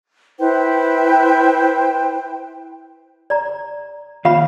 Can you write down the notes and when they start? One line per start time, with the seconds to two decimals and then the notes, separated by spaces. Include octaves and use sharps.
0.39 E4 B4 C5 G5
3.30 D5 A#5
4.25 D#2 F4 F5 B5